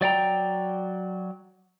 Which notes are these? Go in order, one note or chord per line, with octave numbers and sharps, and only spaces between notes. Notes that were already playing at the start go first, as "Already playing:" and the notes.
F#3 D5 G5 A#5